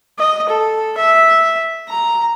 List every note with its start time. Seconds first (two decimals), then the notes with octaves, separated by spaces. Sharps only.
0.18 D#5
0.49 A4
0.98 E5
1.88 A#5